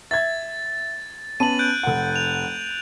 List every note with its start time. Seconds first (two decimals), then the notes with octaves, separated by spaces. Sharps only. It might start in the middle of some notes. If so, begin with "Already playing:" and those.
0.11 E5 G#6 A6
1.40 B3 C#4 A5 D#7 F#7
1.59 F#6 G6 D7
1.83 F1 F#5
2.16 F7